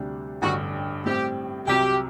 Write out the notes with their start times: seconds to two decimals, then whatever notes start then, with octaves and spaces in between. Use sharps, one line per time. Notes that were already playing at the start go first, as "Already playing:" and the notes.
Already playing: D2 C3 G3 D4
0.42 A1 G2 D3 F#4
1.05 A2 G3 C4 G4
1.67 C2 C3 F#3 G4